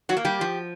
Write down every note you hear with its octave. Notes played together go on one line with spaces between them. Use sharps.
F#3 F#4
A#3
G3 G4
F3